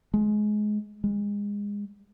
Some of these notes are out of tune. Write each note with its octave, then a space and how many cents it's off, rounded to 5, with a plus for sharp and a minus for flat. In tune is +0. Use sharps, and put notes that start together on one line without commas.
G#3 +20
G#3 -25